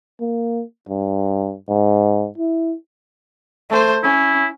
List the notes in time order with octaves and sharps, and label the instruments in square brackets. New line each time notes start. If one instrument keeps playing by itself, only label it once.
[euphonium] A#3
G2
G#2
E4
[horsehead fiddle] A3 C5
[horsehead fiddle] C#4 [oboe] E4